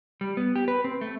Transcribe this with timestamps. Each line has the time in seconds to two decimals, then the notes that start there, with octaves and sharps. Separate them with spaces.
0.21 G3
0.37 B3
0.56 G4
0.68 B4
0.84 C4
1.01 A3